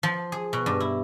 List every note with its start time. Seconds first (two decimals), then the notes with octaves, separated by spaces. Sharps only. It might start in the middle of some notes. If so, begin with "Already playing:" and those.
0.03 F3
0.32 G#4
0.53 B2
0.66 G2
0.80 E4